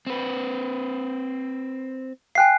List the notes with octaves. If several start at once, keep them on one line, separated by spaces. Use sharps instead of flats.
C4 B4
F5 G5 G#5 F#6 C7